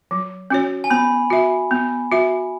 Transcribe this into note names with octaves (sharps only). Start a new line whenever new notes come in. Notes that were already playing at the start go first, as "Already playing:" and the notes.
F#3
C#4 F#4 C#5
G#5
B3 B5
F#4 E5
B3
F#4 E5